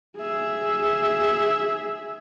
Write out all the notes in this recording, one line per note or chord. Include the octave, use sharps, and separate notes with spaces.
G#4 E5